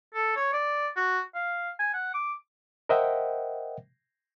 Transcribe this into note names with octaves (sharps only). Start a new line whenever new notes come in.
A4
C#5
D5
F#4
F5
G#5
F#5
D6
A#4 C5 D#5 E5 F#5 G5